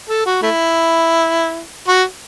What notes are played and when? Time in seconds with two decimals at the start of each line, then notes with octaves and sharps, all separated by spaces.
0.09 A4
0.26 F#4
0.42 A3 E4
1.88 F#4